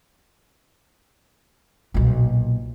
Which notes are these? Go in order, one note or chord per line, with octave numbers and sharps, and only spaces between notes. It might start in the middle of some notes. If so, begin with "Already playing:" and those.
B1 A#2